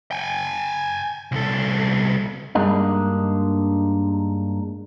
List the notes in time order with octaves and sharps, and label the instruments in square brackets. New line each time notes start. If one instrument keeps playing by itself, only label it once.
[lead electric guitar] G5 G#5
C2 A4
[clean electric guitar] G2 G#3 A#3 D4 D#4